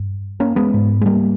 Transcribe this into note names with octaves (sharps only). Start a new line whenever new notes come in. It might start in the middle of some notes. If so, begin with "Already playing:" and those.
Already playing: G2
A#3 C#4
G#3 B3
G#2
G#3
G3 A#3